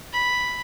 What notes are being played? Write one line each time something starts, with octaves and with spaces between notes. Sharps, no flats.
B5